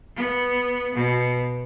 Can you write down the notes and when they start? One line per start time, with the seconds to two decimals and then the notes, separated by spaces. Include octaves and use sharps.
0.15 B3
0.95 B2